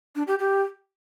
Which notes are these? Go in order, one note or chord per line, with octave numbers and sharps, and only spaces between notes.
D4
G4
G4